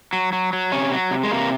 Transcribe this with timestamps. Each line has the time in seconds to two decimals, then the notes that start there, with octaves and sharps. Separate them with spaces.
0.13 F#3
0.33 F#3
0.53 F#3
0.72 C3 C#4
0.91 F#3
1.11 C3
1.23 G#3
1.31 C3 A#3